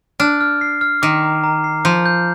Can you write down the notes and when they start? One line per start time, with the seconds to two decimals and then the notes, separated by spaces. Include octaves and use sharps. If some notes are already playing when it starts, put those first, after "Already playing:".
0.20 D4 F6
0.41 F6
0.61 C7
0.81 F6
1.02 D#3 D6
1.23 A#5
1.44 A#5
1.64 C7
1.85 F3 G6
2.06 G6